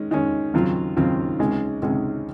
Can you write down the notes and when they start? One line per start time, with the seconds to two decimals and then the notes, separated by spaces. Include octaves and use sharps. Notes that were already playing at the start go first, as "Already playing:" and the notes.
Already playing: D#3 G#3 C#4
0.11 D#3 G#3 C#4
0.54 D#2 C#3 F#3 C4 F4
0.96 D#2 C#3 F#3 C4 F4
1.39 C#2 C3 D#3 G#3 C#4
1.82 C#2 C3 D#3 G#3 C#4